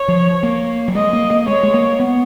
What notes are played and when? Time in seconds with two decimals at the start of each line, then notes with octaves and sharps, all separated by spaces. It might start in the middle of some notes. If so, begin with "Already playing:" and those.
Already playing: C#5
0.08 F3
0.43 A#3
0.88 F#3
0.95 G#3 D#5
1.13 A#3
1.31 A#3
1.48 G#3 C#5
1.63 G#3
1.74 A#3
2.00 B3